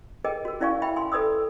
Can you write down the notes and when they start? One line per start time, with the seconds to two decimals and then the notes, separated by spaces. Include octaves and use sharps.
0.24 G#4 A#4 B4 D#5 G5
0.45 F#4 A#4
0.60 C#4 E4 D5 F5 G#5 C#6
0.82 E5 G5 B5
0.96 G#5 C6
1.12 A4 B4 D5 D#6 E6